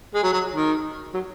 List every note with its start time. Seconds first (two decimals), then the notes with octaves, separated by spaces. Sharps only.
0.14 G#3
0.23 F#3
0.33 F#3
0.54 D#3
1.14 F#3